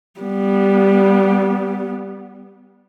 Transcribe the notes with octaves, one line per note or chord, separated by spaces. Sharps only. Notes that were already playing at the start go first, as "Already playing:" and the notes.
G3 B3